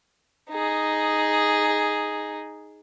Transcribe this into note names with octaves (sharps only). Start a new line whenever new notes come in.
D#4 G#4